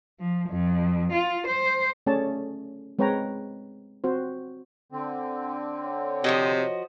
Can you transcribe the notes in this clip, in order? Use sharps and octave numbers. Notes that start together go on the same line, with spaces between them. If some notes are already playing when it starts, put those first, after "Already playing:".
F3
F2
F4
C5
A3 C#4 G#4 C#5 D5 A5
G#3 C4 B4 C#5 G5 A#5
C4 F#4 C5
D3 C4
C#5
C3 F3 F#4 D#5